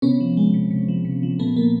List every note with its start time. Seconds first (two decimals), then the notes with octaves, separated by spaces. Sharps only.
0.02 C3 B3 C#4
0.20 F3
0.37 G#3
0.54 C3
0.71 C3
0.88 F3
1.05 C3
1.23 F3
1.39 A#2 A3 B3
1.56 A#2 A#3